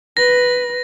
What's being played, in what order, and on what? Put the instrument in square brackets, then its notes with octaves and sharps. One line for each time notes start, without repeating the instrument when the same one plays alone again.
[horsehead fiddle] B4 [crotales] A#6